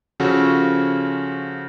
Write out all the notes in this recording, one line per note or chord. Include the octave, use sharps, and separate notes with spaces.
C#3 F3 C#4 F#4 A4